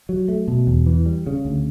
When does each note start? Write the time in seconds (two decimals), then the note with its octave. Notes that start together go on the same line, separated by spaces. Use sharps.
0.09 F#3
0.28 A3
0.48 B2
0.67 E2
0.86 E3
1.06 G3
1.27 C#3
1.45 D2